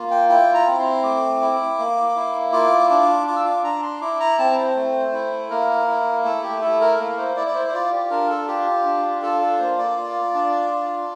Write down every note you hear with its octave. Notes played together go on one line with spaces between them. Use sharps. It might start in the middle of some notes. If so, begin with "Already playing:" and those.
Already playing: A#3 F4
G5
E4 G5
A#5
C4
C6
A3 D6
E4
A#3
E4
F4 D6
D4 D6
F4 D6
E6
D6
D4 A#5
C6
E4 D6
A#5
C4 A5
C5
A3
E4
A#3 A#4
E4
A3 A4
G4
E4 A4
A#4
A#3 A#4
C5
E4 D5
D5
C5
C5
F4 D5
G4
D4 A#4
A4
F4 G4
D4
F4 A4
A4
A#3 C5
D5
F4
D4
F4